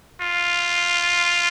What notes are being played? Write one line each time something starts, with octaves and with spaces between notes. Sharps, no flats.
F4